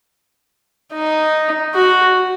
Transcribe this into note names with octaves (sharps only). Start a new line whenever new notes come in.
D#4
F#4